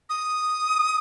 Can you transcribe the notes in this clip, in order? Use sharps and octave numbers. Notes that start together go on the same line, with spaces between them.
D#6